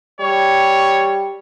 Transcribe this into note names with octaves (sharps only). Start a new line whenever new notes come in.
G3 C#5